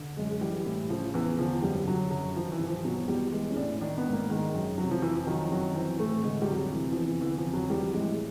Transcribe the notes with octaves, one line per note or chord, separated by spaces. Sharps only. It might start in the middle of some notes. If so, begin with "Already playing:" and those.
Already playing: D3
F#2 G#3
G#3
E3 G3
A2
C#3 F3
E2 E3
D3 F3
F#2 G3
D3 F#3
F#2 F#3
D#3 F3
E3
G2
F3
B2 F#3
E2 G3
E3 G#3
C#4
A2 D4
D#3 D4
B3
G#2
A#3
D#3 G#3
F#2
C3 F#3
F3
F2 E3
F3
D#3 F#3
F#2 F#3
E3 C4
A2 A3
D3 G#3
G3
F2 F#3
C3 E3
F3
E2 E3
D3 E3
F3
F2
F#3
E3 G3
A2 G#3